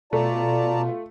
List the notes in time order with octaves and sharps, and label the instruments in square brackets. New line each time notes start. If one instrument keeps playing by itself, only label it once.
[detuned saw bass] B2 [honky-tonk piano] A3 [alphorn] F4 [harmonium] D5 A5 A#5